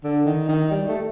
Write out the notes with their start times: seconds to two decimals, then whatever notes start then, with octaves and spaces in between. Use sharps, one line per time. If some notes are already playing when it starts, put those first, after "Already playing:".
0.04 D3
0.26 D#3
0.49 D#3
0.71 G3
0.88 A3